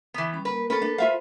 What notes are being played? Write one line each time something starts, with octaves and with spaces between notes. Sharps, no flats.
E3 B3
G3 C#4 B5
A#3 A#4 B4
C#4 A4 B4
D4
F4 C5 E5 F5